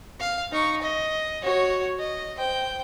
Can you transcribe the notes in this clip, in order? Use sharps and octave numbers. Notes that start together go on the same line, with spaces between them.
F5
D#4 C#6
D#5
F#4 C#5
D#5
C5 G5